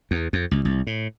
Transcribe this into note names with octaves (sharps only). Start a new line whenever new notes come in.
E2
F2
C#2
C2
A2